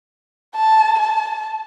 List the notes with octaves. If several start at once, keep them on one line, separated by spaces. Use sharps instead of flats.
A5
A5